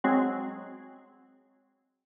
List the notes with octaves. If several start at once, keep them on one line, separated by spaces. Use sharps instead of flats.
F#3 G#3 C4 F#4 G#4